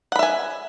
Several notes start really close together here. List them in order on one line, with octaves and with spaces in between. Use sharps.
F#5 B5 E5 G#5